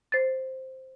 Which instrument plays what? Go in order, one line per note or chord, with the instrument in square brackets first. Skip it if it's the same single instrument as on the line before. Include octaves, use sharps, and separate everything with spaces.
[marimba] C5 A6